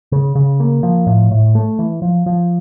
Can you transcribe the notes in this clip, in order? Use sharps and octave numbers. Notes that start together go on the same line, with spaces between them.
C#3
C#3
A#3
F3
A2
A2
A3
E3
F3
F3